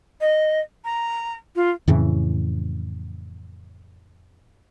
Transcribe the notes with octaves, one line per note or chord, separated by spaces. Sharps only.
D#5
A#5
F4
F2 A2 C#3 E3